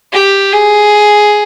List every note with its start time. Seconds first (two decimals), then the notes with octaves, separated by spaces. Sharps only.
0.13 G4
0.52 G#4